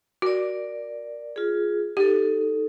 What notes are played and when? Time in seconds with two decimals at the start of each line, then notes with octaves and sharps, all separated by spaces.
0.22 F#4 A#4 D5
1.36 F4 G#4
1.97 D#4 G4 A4